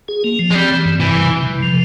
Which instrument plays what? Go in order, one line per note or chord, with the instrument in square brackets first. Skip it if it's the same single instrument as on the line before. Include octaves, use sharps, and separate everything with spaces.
[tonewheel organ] G#4
A#3
F3
[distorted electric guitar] G#3
[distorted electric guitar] G3 [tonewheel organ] C4
[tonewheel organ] E3
G2
[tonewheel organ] C3 [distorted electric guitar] E3
[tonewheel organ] G3
C3
C3
F3